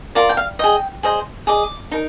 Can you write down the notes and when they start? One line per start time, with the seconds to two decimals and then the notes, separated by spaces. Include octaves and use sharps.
0.15 F4 A#4 D5
0.29 G5
0.37 F5
0.59 G#4 D#5 G5
1.03 G#4 C5 D#5
1.47 G#4 D#5 D6
1.91 D#4 A#4